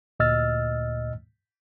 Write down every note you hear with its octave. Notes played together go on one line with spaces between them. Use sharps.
D2 A#2 D#5 E6 F6 A6